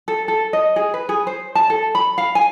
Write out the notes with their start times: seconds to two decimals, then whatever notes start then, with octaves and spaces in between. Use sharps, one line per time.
0.08 A4
0.28 A4
0.53 D#5
0.76 G#4
0.94 B4
1.09 G#4
1.27 C5
1.55 A5
1.70 A4
1.95 B5
2.18 F5
2.35 G#5